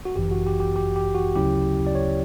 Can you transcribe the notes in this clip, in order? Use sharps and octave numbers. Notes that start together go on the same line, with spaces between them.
F#4
G1 F#2 E3 G4
F#4
G4
G4
G4
G4
F#4
D2 C#3 F#3 C#4 E4 G4
D5
C#5